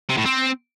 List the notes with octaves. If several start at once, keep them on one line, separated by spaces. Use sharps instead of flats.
C3
A2
C4